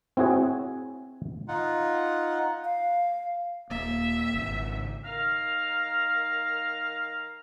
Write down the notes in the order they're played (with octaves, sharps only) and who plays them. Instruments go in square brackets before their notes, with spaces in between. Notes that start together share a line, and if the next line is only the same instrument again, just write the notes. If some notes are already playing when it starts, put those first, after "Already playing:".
[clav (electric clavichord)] C4 E4 F#4 G#4 C#5
[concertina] D#4 F4 F#5
[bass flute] F5
[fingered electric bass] D#1 A#3 [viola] E5
[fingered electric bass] G#1 C#3
[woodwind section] D#3 F5 A#5 F6